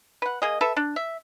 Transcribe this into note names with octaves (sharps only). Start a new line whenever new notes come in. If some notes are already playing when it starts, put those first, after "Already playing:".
B4 F#5
A#3 G#4 D#5
A4 B4 E5
D4
E5